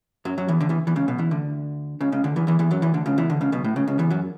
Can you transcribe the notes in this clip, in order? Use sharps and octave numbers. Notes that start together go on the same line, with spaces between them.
F#2 F#3
F#2 F#3
E2 E3
D2 D3
E2 E3
E2 E3
C#2 C#3
B1 B2
E2 E3
D2 D3
C#2 C#3
C#2 C#3
D2 D3
E2 E3
E2 E3
E2 E3
F#2 F#3
E2 E3
D2 D3
C#2 C#3
E2 E3
D2 D3
C#2 C#3
B1 B2
A2
C#2 C#3
C#2 C#3
E2 E3
F#2 F#3